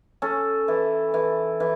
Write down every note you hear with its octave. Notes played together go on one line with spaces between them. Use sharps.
C#4 A4
E3
E3
E3